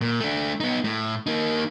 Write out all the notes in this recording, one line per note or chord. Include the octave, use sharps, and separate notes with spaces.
A#2
A3 D4
B3 D#4
A2
A#3 D#4